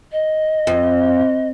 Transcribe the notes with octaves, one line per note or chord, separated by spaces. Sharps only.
D#5
F2